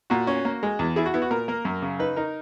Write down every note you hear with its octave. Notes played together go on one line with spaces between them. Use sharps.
A#2 F#4
C#4
A#3
G#3
E2
E4 G#4
F#4
B3 E4
F#4
A#2 A#4
A#3 A#4
F#2
C#3
D#4 B4
D#4 A#4